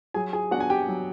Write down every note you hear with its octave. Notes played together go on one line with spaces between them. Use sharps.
F#3 G#4 G#5
G#4 G#5
B3 D4 F#4 F#5
G#5
G4 G5
F#3